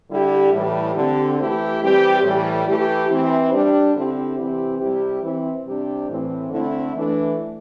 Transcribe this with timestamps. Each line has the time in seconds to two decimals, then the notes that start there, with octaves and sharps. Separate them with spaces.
0.10 D3 G3 E4 G4
0.53 A2 E3 G3
0.95 D3 C4 G4
1.38 E3 A3 E4 G4
1.81 E3 G3 C4 G4
2.23 A2 E3 G3
2.65 E3 A3 E4 G4
3.08 E3 C4 E4
3.51 G3 D4 G4
3.94 D3 C4 E4 G4
4.37 C3 E3 C4 E4 G4
4.79 C3 G3 E4 G4
5.22 E3 C4 E4
5.64 C3 G3 D4 G4
6.07 A2 E3 C4
6.50 D3 A3 C4 E4
6.93 E3 A3 D4